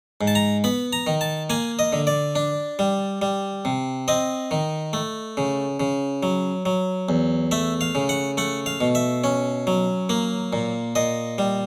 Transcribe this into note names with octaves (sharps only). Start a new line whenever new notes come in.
G#2
A5
A#5
B3 B5
A#5
D#3
A5
A#3 G#5
D#5
D3
D5
D4
G3
G3
C3
C4 D#5
D#3
A3
C#3
C#3
F#3
F#3
E2
A3 E5
F5
C#3
F#5
A3 F#5
F5
B2
E5
C#4
F#3
A#3
A#2
A#2 D#5
G3